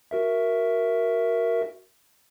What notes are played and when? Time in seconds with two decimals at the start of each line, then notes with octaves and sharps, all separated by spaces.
0.11 F#4 A#4 E5